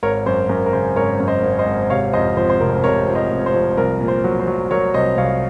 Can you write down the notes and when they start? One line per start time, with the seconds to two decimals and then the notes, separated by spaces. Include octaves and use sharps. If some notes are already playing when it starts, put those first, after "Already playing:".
0.03 G#1 A#4 C#5
0.26 F#2 C5
0.49 F#2 A#4
0.66 A#4
0.73 C#3 C5
0.96 G#1 A#4 C#5
1.20 F#2
1.27 C5 D#5
1.43 G#1
1.59 C5 D#5
1.66 G#1
1.90 C3 C#5 F5
2.13 F2 C5 D#5
2.37 F3 C5
2.50 C5
2.60 F1 A#4
2.84 C3 A#4 C#5
3.07 F3
3.15 C5 D#5
3.30 F1
3.46 C5
3.54 F3
3.77 C2 A#4
4.01 A#2
4.08 C5
4.24 F#3
4.40 C5
4.47 F#3
4.71 F#3 A#4 C#5
4.94 C2 C5 D#5
5.18 C2 C#5 F5